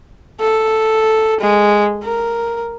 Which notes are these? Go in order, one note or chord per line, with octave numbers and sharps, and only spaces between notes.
A4
G#3
A#4